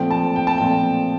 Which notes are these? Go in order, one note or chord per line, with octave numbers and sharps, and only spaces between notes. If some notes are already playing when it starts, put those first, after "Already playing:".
Already playing: A#2 F3 A3 C4 G5
A5
G5
A5
A#2 F3 A3 C4 G5